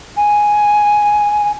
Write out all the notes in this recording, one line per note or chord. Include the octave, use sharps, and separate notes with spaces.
G#5